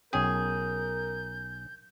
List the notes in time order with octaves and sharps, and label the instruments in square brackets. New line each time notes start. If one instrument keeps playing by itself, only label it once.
[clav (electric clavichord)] B1 C#4 G5 [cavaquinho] G#4 [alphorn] A#4 [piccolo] G6